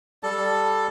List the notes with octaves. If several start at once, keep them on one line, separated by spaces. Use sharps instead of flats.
G3 A4 A5